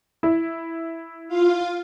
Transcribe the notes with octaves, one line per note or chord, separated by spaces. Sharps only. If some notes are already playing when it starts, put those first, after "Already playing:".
E4
F4 F5